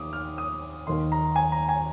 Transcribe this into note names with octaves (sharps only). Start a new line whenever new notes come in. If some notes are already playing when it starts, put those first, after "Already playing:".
Already playing: D#2 D6 D#6
F6
D#6
D#2 D#3 C6
A#5
G#5
A#5
G#5